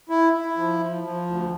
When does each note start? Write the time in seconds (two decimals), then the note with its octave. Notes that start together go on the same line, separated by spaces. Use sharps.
0.09 E4
0.33 E4
0.57 F3
0.80 F3
1.04 F3
1.27 D2